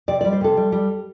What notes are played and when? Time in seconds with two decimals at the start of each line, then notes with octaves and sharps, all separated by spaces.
0.08 C3 D5
0.21 G3 D5
0.32 C5
0.41 C3 A4
0.57 G3
0.72 G3